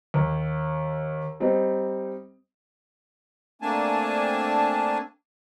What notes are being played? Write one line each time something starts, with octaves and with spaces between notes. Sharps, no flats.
D#2
G3 C4 D#4
A3 A#3 C4 D4 G#5 A5